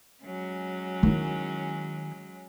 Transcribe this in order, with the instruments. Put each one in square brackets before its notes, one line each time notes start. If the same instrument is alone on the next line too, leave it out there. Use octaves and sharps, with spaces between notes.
[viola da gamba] F#3 G#3 C#4
[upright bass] D#3 E4